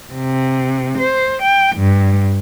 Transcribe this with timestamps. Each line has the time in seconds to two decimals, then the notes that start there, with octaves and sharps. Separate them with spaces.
0.14 C3
0.98 C5
1.43 G5
1.76 G2